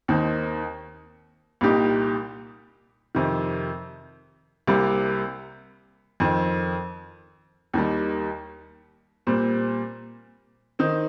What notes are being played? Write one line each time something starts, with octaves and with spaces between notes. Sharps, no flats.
D#2 D#3 C4 D#4
C2 A#2 G3 D#4 G4
F2 C3 D#3
C2 C3 G3 A#3
F2 D#3 C4
D#2 D#3 G3
A#2 G3 C4
D#3 C4 D#4